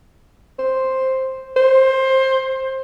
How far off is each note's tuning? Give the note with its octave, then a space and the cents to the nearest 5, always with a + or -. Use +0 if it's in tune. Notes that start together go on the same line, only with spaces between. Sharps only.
C5 +5
C5 +15